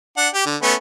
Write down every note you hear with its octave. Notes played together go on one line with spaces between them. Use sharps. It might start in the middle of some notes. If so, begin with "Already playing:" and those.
D4 F#5
G4
D3
A3 B3 C#4